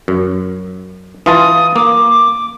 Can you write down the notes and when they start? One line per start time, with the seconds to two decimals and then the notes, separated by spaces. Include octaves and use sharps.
0.08 F#2
1.26 E3 F4 A5 D#6
1.76 A#3 D6